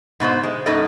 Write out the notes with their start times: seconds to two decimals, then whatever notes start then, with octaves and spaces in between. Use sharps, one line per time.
0.20 G#2 B2 B3 C5
0.43 G#3
0.66 F#2 A#3 D#4 A4 B4 D#5